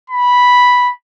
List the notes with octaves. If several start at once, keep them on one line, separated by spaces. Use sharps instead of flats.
B5